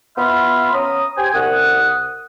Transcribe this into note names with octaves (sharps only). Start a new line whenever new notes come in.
B3 F4 E5 B5 C6 F6
C#4 C#5 A#5 D#6
G4 C5 G5 G#5
C2 F#5 D#6